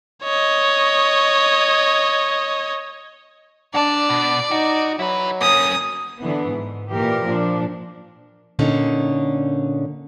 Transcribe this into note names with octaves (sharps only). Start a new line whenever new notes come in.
C#5 D#5
F#3 D4 D5 A5
B2
D#4 F#4
F#3 E4 B4
A#3 C#4 D#6
D3 E3 B3
G#2
A#2 E3 G4 A#4
A#2 F3 D4
A#2 D3 C#4 D#4